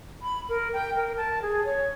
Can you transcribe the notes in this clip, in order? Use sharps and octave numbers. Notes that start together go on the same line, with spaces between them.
B5
A#4
G5
A#4
A5
G#4
C#5